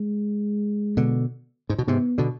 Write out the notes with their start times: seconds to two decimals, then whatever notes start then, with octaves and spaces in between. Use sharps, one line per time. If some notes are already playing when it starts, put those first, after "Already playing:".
Already playing: G#3
0.97 B2 D3
1.69 G#2
1.78 B2
1.88 G#2 C3 B3
2.18 B2 D3